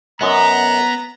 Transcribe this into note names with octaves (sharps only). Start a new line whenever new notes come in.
F#2 B3 D#5 A#5